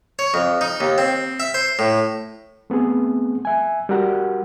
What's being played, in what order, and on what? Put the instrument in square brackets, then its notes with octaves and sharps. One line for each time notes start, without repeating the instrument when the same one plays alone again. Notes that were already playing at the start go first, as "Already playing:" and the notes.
[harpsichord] C#5
F2
D#4
D#2
C4
E5
C5
A2
[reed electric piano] A3 B3 C4 G#4
E5 G#5
G3 F#4 A#4 F#5